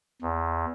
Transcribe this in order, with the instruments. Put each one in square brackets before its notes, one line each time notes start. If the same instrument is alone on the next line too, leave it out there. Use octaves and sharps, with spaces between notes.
[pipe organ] E2